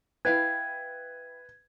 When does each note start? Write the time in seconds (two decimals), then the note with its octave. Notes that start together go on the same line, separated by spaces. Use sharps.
0.25 E4 B4 F5 G5 G#6